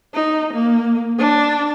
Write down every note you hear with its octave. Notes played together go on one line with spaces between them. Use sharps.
D#4
A#3
D4